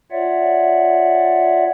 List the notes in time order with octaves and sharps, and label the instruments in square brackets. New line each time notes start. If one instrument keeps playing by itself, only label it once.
[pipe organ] F4 C#5 D5 E5 F#5